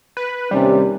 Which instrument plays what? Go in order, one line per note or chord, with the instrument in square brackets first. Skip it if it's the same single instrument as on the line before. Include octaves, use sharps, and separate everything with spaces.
[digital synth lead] B4
[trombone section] D#2 C3 C#4 [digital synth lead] G3